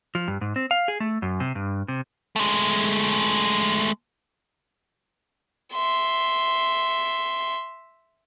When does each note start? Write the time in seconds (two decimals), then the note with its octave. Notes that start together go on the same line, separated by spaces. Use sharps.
0.15 F3
0.28 G2
0.41 G#2
0.56 C4
0.71 F5
0.88 G#4
1.00 A3
1.22 F#2
1.40 C3
1.55 G2
1.88 C3
2.36 G#3 A3
5.74 E5 C6